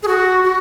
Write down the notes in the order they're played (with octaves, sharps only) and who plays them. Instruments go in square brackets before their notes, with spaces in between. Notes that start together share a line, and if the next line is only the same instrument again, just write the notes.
[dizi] G#4
F#4
F#4